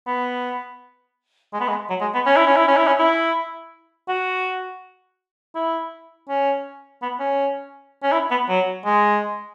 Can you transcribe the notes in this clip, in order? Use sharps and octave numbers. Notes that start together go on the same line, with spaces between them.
B3
G#3
B3
G#3
F#3
G#3
B3
C#4
E4
C#4
E4
C#4
E4
C#4
E4
F#4
E4
C#4
B3
C#4
C#4
E4
B3
F#3
G#3